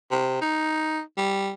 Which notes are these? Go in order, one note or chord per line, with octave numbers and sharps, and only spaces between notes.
C3
D#4
G3